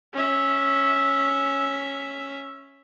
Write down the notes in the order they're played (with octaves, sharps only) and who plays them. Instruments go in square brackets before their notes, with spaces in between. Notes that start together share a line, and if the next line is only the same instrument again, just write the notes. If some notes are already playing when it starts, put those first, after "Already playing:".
[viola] C#4 E5